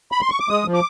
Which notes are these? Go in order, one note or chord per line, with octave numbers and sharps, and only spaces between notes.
B5
C6
C#6
D6
G#3 D#6
F3
D6